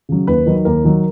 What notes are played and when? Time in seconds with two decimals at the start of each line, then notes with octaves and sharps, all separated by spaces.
0.09 C#3 F#3
0.27 D#2 B4
0.46 D#3 F#3
0.65 D#2 A#4
0.84 D#3 F#3